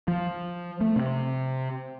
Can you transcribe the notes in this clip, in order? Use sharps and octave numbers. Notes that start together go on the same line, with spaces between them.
F3
A3
C3